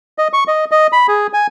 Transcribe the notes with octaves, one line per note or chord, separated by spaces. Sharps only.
D#5
C#6
D#5
D#5
B5
G#4
G#5